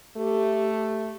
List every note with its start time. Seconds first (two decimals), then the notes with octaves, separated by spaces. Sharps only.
0.17 A3 G4